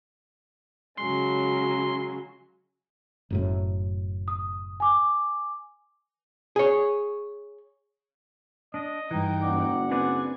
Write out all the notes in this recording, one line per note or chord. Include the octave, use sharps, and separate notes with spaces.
C#3 F#3 G#3 C6
F#1 F#2 A2
D#6
G#5 D6
G#4 C#5
D4 D#5
G2 E3 D#4 G5
F#1 D5 F#5
C4 D4 B4 D5 G#5